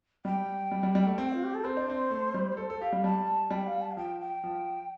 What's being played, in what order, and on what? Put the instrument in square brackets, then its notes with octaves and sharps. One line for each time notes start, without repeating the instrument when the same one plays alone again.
[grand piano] G3 [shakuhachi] G5
[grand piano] G3
G3
G3
A3
C4
[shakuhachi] F4
G4
A4
[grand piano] C4 [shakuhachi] C5
[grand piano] D4
C4
A3
G3
A4
A4
[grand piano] G4 [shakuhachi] F5
[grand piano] G3
[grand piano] G3 [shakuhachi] A5
[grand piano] G3 [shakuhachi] G5
[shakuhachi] F5
A5
F5
[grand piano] F3 [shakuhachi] G5
[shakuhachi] G5
[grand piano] F3